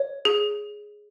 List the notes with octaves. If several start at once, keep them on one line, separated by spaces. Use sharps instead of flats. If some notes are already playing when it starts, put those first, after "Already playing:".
Already playing: C#5
G#4